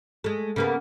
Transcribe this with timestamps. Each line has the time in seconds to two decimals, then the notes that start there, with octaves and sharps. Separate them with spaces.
0.24 G#3 A3
0.56 C#3 A#3 B3